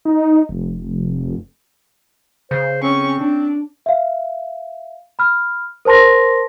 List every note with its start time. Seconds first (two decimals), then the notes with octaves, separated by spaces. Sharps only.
0.05 D#4
0.49 F1
2.51 C#3 C5
2.83 C4 C#4 C#6
3.19 D4
3.86 E5 F5
5.19 B5 F6
5.85 A#4 C5 A5 C6 A#6